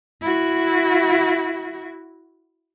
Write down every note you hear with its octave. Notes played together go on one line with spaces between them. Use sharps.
E4 F#4